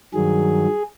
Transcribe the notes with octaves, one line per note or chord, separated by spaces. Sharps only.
G2 D#3 F#3 G#4